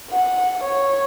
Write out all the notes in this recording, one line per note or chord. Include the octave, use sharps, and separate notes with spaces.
F#5
C#5